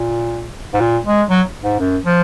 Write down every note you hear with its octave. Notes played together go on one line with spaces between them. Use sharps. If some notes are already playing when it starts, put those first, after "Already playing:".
Already playing: A#2
G#2
A#2
G#3
F#3
G#2
F#2
F3